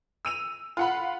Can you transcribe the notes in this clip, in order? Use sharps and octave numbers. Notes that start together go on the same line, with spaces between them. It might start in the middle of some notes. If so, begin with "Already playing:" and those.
E6 D#7 F7
F4 F#5 B5